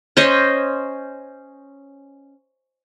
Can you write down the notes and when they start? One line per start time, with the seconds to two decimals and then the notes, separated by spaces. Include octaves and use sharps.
0.17 C#4 C5 D#5